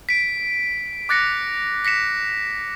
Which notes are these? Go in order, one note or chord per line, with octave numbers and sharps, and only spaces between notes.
B6 D7
D6 F#6 A6 A#6 C#7
A#6 B6 C#7 E7